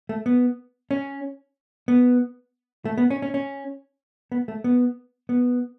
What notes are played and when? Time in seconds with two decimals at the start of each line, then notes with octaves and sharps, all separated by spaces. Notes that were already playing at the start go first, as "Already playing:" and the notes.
0.09 A3
0.26 B3
0.91 C#4
1.88 B3
2.85 A3
2.98 B3
3.10 C#4
3.22 C#4
3.34 C#4
4.32 B3
4.48 A3
4.64 B3
5.29 B3